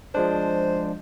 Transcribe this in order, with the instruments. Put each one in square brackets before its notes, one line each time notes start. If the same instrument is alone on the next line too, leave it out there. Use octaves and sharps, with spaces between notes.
[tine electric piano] F3 G#3 D4 [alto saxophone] C5